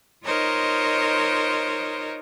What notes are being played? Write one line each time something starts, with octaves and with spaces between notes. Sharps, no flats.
D#4 F4 A#4 C5 C#5 D#5